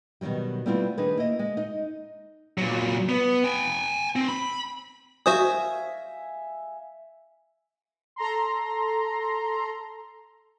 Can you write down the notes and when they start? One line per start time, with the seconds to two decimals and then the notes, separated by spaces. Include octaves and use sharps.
0.21 B2 D#3 E3 F#3 G3
0.66 G3 A3 B3 C4 E4 F4
0.98 D#3 D4 D#4 G#4 B4
1.17 A#3 E4 D#5
1.39 G#3
1.57 D#4 D#5
2.58 A#2 F#3
3.09 B3
3.44 G5 G#5
4.16 C4
4.28 B5
5.26 F#4 C5 E5 F5 G#5 D#6
8.16 A4 A#5 C6